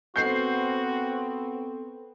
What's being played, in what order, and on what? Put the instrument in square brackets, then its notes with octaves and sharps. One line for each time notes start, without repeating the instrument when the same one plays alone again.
[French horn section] B3 C4 [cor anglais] F#4 [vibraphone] A4 [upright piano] G6 C7